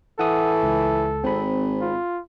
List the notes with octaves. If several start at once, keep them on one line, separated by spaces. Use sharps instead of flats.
E3 A4 F#5 D#6
C#2
G#1 C4 B5
F4